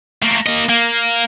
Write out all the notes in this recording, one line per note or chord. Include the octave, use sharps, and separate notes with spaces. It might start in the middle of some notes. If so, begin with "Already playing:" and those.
A3 A#3
A#3 D#5
A#3